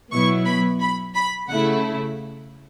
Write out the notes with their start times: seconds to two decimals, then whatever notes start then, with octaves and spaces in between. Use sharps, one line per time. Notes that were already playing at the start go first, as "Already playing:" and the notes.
0.11 B2 F#3 B3 E4 C#6
0.46 B5
0.81 B5
1.15 B5
1.48 C#3 A3 E4 F#5